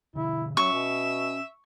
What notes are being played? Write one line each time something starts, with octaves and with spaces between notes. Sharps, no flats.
B2 D3 E4
F#3 C#4 E5 C#6
B2